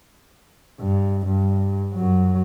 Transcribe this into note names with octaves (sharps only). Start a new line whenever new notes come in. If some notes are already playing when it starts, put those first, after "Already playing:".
G2
G2
F#2 F#3